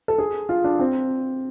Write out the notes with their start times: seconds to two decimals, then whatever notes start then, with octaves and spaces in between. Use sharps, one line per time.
0.08 A4
0.18 G#4
0.49 F4
0.64 D4
0.80 C4